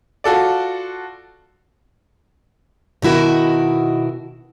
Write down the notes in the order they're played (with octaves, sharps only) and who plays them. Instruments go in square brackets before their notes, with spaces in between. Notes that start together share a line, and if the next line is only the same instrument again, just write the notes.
[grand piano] F4 F#4 A4 D5
[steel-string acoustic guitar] B2 D#3 E4 F#4 A#4